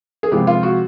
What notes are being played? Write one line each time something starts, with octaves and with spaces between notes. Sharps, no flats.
G#4
C3 F3 G#3 B3 G4
F4
F#4